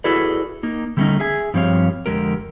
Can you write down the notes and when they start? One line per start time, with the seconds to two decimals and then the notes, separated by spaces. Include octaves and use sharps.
0.04 E4 F#4 G#4 A4 B4 D5
0.63 A#3 D#4
0.97 D3 G3 A3 C4 C#4 D#4
1.20 G#4 E5 G#5
1.54 G2 F3 C4 G4 C#5 F5
2.06 F2 D3 G#3 G4 A#4